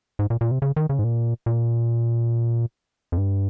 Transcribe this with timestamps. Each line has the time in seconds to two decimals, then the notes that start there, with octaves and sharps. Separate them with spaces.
0.19 G#2
0.30 A#2
0.41 A#2
0.51 C3
0.62 C#3
0.76 D#3
0.89 C#3
0.99 G#2
1.04 A#2
1.46 A#2
3.12 F2
3.18 G2